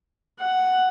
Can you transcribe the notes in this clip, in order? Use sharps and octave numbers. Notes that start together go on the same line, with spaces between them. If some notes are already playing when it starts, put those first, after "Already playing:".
F#5